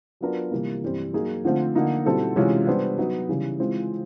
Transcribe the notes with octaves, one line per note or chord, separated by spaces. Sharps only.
F#3 B3 D4 F4 A#4
C3 E3 G3 A#3
G2 E3 G3 C4
F#3 A#3 D#4 G#4
D3 F3 A3 C4 F4
D3 F3 A#3 D#4
B2 G3 C4 E4 A4
C3 E3 G#3 C#4 F4
G3 B3 D4 G4 C5
F#3 B3 D#4
C#3 E3 G3
E3 G#3 C4 F4